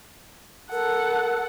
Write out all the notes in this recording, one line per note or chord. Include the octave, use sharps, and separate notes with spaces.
A4 A#4 F#5